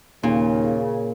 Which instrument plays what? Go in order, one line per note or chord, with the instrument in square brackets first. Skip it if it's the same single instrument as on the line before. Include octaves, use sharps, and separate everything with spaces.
[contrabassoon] D#2 [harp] A#2 [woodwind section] C#3